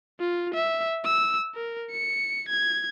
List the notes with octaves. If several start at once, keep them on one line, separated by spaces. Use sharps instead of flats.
F4
E5
E6
A#4
C#7
G#6